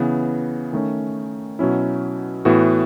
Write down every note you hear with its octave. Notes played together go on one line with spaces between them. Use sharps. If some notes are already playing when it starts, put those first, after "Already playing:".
Already playing: C#3 E3 B3
D#3 A3 C#4
B2 F#3 C#4 E4
A2 E3 B3 F#4